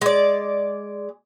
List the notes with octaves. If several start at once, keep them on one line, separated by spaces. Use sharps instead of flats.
G#3 D5